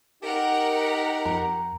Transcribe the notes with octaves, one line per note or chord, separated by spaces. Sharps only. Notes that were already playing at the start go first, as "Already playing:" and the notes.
D#4 G4 A#4 F#5
F2 A#5